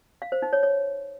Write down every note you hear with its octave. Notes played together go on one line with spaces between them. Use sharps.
F5
C5
D#4
C#5
C#5